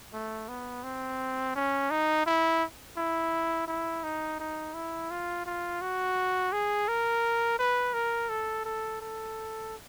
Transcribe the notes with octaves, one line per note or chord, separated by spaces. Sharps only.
A3
B3
C4
C#4
D#4
E4
E4
E4
D#4
D#4
E4
F4
F4
F#4
G#4
A#4
B4
A#4
A4
A4
A4